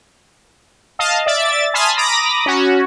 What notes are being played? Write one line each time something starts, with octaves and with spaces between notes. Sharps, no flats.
D#5 F5 A5
D5 E5 A6
G#5 A5 B5 C6 D#6 F6
A#5 B5 D6 D#6 A#6
C#4 F#4